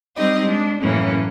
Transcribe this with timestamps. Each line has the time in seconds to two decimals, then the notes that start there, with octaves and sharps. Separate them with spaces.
0.16 G3 C4 D#4 G4 D#5
0.44 G#3 D4
0.81 F#2 A2 E3 A#3 C#4